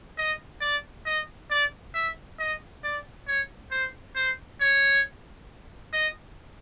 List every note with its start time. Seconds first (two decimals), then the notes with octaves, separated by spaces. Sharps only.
0.18 D#5
0.61 D5
1.06 D#5
1.50 D5
1.94 E5
2.40 D#5
2.84 D5
3.27 C#5
3.71 C5
4.16 C5
4.60 C#5
5.93 D#5